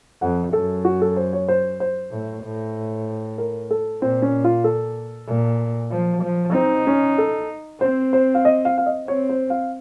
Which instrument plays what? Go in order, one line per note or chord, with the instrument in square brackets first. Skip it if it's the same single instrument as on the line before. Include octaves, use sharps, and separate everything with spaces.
[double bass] F2 [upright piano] F#5
[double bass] F#2 [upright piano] A4
[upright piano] F#4
A4
C5
C#5
C5
C5
[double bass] A2
A2
[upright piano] A#4
A4
[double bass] A#2 [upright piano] C4
[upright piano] C#4
F4
A4
[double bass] A#2
F3
F3
[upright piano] C4 [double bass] D#4
[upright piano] C#4
A4
[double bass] C4 [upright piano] C5
[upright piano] C5
F5
D#5
F5
F5
D#5
[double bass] C4 [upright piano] C#5
[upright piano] C5
F5